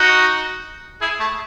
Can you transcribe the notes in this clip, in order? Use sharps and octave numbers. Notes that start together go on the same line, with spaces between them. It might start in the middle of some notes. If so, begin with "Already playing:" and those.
Already playing: D#4 F#4
E4 G#4
A3